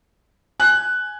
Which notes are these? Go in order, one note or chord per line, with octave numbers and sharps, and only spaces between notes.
G#5 F#6